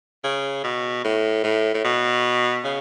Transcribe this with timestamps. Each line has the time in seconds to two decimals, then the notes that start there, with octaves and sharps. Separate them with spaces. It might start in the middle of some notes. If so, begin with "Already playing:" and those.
0.24 C#3
0.64 B2
1.05 A2
1.44 A2
1.74 A2
1.84 B2
2.64 C#3